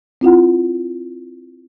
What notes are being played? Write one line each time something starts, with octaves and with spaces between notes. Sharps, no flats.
C4 E4 F4 F#5